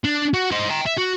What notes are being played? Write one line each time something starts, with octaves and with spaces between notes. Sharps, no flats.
D4
F#4
D#4 C5
G5 A#5
E5
F#4